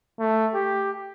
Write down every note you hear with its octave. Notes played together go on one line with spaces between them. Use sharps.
A3
G4